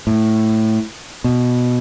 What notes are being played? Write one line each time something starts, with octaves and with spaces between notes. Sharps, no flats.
A2
B2